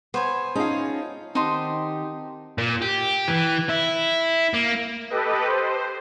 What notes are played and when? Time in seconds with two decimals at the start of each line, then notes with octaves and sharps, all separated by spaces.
0.14 B3 C5 C#5 G#5
0.55 C#4 D#4 F4 G#4 D#5 A5
1.35 D#3 C4 D#4 G4 C5 A5 C6
2.58 A#2
2.82 G4
3.28 E3
3.69 E4
4.54 A#3
5.10 G4 A4 B4 D#5
5.45 C5